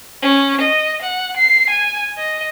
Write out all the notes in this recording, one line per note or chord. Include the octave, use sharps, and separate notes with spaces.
C#4
D#5
F#5
C7
G#5
D#5